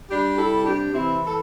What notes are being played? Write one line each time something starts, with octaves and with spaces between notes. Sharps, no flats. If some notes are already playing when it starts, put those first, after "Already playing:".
G3 D4 G4
E4 A4
C3
D4 G4
E3 C4 E4
A4